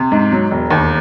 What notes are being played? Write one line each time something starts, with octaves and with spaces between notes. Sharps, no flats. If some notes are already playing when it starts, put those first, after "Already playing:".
Already playing: C3
G#2
F#3
E1
D#2